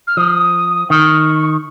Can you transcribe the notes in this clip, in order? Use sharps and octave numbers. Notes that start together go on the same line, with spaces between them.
F6
F3 D#6
D#3 C#6